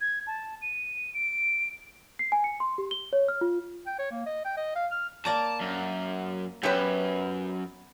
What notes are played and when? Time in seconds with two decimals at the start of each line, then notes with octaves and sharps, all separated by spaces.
0.01 G#6
0.27 A5
0.62 D#7
1.14 D7
2.19 C7
2.32 G#5
2.44 C#7
2.60 C6
2.78 G4
2.91 G7
3.13 C#5
3.28 F6
3.41 F4
3.87 G5
3.99 C#5
4.11 A#3
4.26 D#5
4.45 G5
4.57 D#5
4.76 F5
4.91 F6
5.25 A#3 D5 A5 A#5
5.60 F#2
6.63 F#2 B3 G4 B4 C#5 E5